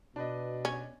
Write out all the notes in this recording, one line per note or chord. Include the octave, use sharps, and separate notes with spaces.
B2 D4 B4 D#5
C#4